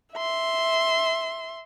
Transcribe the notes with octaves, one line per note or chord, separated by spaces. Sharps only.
E5 C6